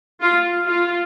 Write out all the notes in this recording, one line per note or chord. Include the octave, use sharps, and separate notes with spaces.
F4
F4